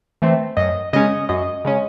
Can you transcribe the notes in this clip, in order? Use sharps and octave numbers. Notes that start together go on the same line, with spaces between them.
E3 A3 C4
F#2 D#5
C#3 G#3 C#4 D#5
F#2 D#5
C#3 G#3 C#4